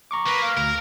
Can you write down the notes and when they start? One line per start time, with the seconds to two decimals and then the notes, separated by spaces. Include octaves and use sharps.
0.11 A#5 C#6 D6
0.27 A#3 B4
0.43 F5
0.57 D2 A#4